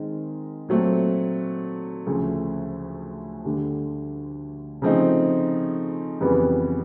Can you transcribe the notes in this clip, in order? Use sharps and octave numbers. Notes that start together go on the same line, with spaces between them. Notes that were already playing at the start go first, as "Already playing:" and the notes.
Already playing: D#3 G#3 C4 D#4
A#2 F#3 A3 C4
D2 C#3 F3 A3
D2 D3 G3
C#3 F3 A3 C4 D#4
F2 C#3 E3 G3 B3